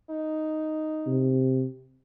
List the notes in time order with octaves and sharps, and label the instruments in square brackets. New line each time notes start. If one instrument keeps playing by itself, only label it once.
[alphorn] D#4
[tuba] C3